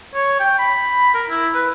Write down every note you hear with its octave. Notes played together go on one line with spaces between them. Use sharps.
C#5
G5
B5
A#4
E4
B4